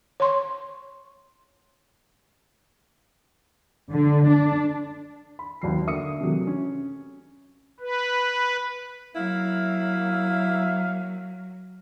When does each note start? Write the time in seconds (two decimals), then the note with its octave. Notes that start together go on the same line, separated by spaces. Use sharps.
0.20 C#5 C6 C#6
3.90 D3
4.29 D4
5.39 B5
5.62 E1 D#2 F#3 C7
5.86 D3 A#3 E5 D#6 C#7
6.21 C3 E3 F#3 A3
6.47 C#4
7.80 B4
9.16 F#3 A#3 E4 E5 F5